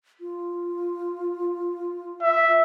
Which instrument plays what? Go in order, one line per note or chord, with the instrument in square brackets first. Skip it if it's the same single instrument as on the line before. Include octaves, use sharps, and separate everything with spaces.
[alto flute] F4
[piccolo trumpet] E5